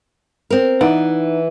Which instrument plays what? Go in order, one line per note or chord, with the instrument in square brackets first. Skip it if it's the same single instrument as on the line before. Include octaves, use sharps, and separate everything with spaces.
[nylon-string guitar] C4 A#4
[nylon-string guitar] E3 [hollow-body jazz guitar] D#4 D5 F#5